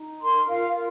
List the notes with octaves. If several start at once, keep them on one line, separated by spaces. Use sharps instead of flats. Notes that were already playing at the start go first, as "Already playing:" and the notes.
Already playing: D#4
A#4 C6
F4 F5
A#4